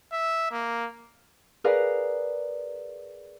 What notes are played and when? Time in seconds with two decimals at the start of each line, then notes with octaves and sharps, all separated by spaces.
0.12 E5
0.52 A#3
1.64 G#4 A#4 B4 D5 F5